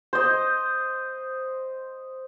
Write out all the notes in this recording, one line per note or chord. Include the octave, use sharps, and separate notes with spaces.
C5 D#5